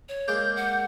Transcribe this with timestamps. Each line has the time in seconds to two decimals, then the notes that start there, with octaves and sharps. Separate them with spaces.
0.09 C#5
0.28 G#3 A#3 D6 G6
0.56 F#5